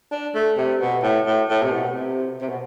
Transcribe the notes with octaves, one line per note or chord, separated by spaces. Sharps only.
D4
A3
C3
B2
A2
A2
A2
C3
B2
C3
C3
B2